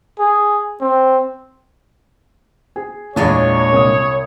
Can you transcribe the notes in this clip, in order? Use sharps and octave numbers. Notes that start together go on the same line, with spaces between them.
G#4
C4
G#4
E2 A#2 G#3 D4 C#5
C2 D#6